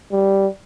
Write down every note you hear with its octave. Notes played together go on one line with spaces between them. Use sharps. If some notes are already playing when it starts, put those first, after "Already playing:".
G3